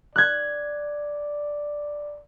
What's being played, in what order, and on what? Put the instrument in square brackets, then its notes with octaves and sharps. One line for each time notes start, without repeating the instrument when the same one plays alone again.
[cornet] D5 [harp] F#6 G#6